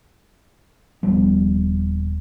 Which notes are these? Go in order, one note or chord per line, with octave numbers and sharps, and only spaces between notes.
D#1 F3 G3 B3